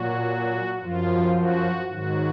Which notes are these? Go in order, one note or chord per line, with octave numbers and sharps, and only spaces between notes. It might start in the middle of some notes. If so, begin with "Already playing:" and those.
Already playing: A#2 F#3 F#4
F#2 F3 F4
F#4
G#2 D#3 F#3 F#4